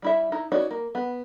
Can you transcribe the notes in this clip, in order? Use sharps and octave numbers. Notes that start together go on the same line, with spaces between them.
G3 E4 E5
D#4 E4
C#4 D#4 F#4 C#5 D5
A#3
B3